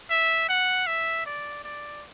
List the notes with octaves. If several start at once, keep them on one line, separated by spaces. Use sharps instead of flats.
E5
F#5
E5
D5
D5